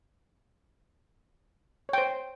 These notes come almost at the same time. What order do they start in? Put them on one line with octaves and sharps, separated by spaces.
C#5 G5 C5